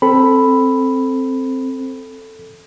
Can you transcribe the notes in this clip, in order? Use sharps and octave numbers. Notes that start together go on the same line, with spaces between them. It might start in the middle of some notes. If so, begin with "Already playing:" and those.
C4 A4 B5